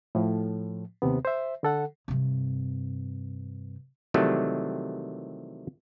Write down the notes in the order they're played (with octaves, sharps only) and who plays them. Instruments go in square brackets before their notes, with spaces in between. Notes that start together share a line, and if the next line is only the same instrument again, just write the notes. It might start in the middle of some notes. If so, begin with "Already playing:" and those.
[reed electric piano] A2 F3
D#2 C3 B3
C5 E5
D3 A4 F#5
[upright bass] G2 C3
[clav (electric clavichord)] C3 D#3 E3 F#3 G3 A3